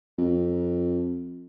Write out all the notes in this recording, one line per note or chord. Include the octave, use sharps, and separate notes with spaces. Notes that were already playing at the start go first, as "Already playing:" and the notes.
F2